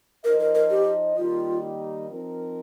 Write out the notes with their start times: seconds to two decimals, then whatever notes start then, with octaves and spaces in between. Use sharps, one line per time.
0.24 F3 D#4 A#4 C5 D#5
0.40 A#4
0.55 A#4
0.70 G4
1.17 D#3 G3 A#3 D#4 F4 G4
2.09 F3 C4 D#4 A#4